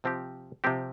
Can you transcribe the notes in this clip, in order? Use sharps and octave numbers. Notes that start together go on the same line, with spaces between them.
C3 F3 C4 G4
C3 F3 C4 G4